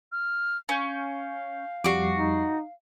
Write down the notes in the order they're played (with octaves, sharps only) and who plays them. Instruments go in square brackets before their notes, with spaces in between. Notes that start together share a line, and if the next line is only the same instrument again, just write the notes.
[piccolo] F6
[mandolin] C#4 [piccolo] F5 [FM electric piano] G#5 G6
[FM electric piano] F2 G3 C7 [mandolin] F#4 D6
[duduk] D#4